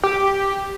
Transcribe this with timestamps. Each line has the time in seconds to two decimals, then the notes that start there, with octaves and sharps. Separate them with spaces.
0.03 G4